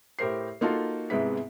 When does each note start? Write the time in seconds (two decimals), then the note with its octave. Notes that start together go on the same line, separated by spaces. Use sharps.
0.19 A2 G4 A#4 C5 C7
0.61 A#3 D#4 F4 F#4 A4
1.10 G#2 C3 G#3 B3 E4 B6